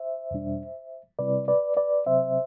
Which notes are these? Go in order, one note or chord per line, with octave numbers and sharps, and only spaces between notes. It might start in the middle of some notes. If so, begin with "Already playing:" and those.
Already playing: C5 E5
E2 B2 G3 D4
C3 G3 C4 E4 B4 D5
B4 D5
B4 D5
C3 F#3 C4 C5 E5